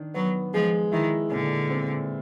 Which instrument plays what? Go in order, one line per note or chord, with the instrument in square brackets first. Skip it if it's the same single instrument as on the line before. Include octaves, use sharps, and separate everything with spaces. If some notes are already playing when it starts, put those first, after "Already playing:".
Already playing: [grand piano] D#3 D4
[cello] F#3 [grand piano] B3
[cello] F3 [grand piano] G#3
[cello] D#3 [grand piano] E4
[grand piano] A#2 [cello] D3
[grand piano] C4